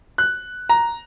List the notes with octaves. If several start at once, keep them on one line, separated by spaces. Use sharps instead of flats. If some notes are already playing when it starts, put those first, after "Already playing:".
F#6
A#5